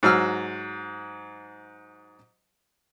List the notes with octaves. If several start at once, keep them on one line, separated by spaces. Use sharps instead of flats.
G#2 F#3 E6 F6